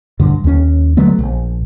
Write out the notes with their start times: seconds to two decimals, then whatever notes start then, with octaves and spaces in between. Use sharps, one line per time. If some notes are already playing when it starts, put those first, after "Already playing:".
0.19 E1 G2 D3
0.44 D#2 C#4
0.97 D3 F#3 A3 B3
1.19 A#1